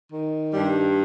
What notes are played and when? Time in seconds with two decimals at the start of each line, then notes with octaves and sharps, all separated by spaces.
0.11 D#3
0.53 G2 G3